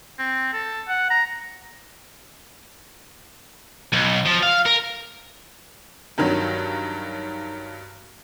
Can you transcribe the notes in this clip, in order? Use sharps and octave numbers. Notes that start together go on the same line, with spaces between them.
C4
A4
F#5
A#5
B1
F3
F5
A#4
G2 D#3 F#3